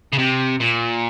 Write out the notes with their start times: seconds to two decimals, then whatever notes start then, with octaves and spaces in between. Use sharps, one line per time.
0.13 C#3
0.19 C3
0.60 A#2